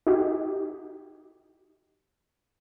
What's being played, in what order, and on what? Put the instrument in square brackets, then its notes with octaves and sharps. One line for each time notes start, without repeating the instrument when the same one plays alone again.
[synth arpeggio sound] D#4 F#4 G4